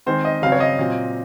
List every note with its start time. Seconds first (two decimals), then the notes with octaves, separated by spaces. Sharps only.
0.06 D#3 G#3 C4 C5
0.25 D#5
0.42 C#3 F#3 C4 F5
0.52 C#5
0.60 D#5
0.79 A#2 F#3 C4